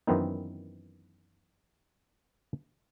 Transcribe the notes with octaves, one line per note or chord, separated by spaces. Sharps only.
F#2 D#3 E3 B3 C4 D#4